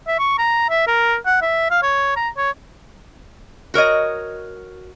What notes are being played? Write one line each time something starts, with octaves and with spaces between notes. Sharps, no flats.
E5
C#6
A#5
E5
A#4
F#5
E5
F5
C#5
A#5
C#5
F#4 A#4 C#5 D#5